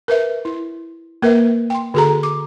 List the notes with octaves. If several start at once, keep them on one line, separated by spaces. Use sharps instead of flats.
A#4 B4 E5
E4
A#3 A#4 B4 E5
G5 C6
D3 F#4 G#4 A4 A#5
D6